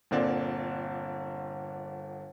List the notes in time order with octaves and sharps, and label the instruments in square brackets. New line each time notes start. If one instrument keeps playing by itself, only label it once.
[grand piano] G1 A#2 D3 C4 D5